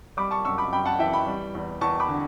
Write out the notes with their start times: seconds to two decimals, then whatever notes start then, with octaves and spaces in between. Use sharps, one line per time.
0.17 G3 B5 D6
0.31 A5 C#6
0.45 F#2 C#6 E6
0.58 B5 D6
0.72 F#2 G5 B5
0.85 F#5 A5
0.99 E3 E5 G5
1.13 G5 B5
1.27 G3
1.55 E2
1.81 E2 A5 C#6
2.00 B5 D6
2.08 D3